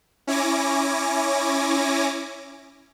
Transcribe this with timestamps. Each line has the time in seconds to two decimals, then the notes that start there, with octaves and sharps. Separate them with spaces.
0.27 C#4 E4 C#5 G#5 D6 A#6